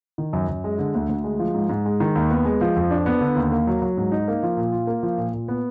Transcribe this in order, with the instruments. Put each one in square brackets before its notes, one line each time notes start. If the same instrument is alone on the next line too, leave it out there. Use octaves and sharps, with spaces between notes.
[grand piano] D#3
F#2
F#2
G#3
D3
D2
D2
G#3
F3
G#2
G#2
G#3
D#3
D#2
B3
G#3
F3
F2
D4
B3
D3
D#2
A#3
F#3
F#3
G#2
D#4
A#3
F3
A#2
F4
A#3
F3
A#2
A#2
B3